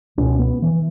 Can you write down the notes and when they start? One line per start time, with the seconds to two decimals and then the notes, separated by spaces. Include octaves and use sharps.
0.17 C#2 B2 C#4
0.39 B3
0.62 E3